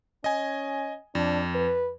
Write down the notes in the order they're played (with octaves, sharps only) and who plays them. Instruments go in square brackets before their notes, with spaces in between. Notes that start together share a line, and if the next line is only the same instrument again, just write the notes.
[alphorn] C#4 [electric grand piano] D#5 G#5
[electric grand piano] F2 [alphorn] D4
[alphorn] B4